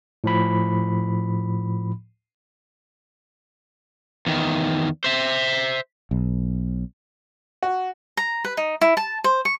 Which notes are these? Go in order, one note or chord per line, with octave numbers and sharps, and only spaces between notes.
A2 F3 B5
E2 D#3
C5 E5
B1
F#4
A#5
B4
D#4
E4
A5
C5
C#6